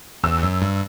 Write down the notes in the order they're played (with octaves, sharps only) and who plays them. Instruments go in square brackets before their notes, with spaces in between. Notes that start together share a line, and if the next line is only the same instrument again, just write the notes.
[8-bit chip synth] E2 [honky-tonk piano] E6
[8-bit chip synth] F#2
G2